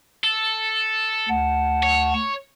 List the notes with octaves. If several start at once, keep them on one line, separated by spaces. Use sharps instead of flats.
A4
D2 F#5 A5
C#5